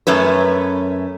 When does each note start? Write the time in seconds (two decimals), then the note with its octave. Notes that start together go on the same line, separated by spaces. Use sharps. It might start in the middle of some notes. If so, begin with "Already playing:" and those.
0.07 F#2 A3 C#4 B4